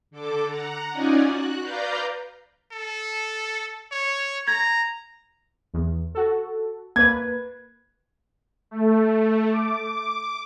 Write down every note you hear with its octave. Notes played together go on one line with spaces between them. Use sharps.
D3 A4 D6
F#5 A#5
C#4 D#4 F4 D5 F#5 G#5
F#4 F#6
B4 D5 F5 A#5 G6
A4
C#5
A#5 G#6
E2
F#4 A4
A#3 B4 G#6
A3
D6